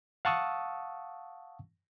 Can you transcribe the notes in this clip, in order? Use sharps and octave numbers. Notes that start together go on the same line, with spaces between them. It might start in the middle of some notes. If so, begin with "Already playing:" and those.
F5 F#5 A5 C#6 D#6 E6